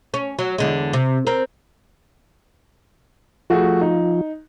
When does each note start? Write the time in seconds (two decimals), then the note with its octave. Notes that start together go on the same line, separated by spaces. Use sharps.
0.14 C#4
0.39 F#3
0.58 E2 D3 G#3
0.93 C3
1.27 C4 A#4
3.50 F3 A3 F4 F#4 G#4
3.81 D#4